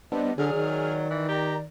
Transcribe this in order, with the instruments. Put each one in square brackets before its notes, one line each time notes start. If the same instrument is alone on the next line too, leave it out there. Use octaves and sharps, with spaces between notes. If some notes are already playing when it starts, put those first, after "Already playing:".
[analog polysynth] G3 B3 D4 [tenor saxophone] C4 [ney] D#5
[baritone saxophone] D3 [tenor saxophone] F#3 [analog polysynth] G#4 F6 [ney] D5
[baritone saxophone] D#3
[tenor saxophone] E3
[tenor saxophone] G4 [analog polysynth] A#4 A#5